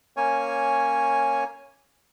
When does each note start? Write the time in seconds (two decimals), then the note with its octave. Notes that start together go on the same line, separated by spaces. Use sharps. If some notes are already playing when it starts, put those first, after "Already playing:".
0.17 A#3 C#4 C#5 G#5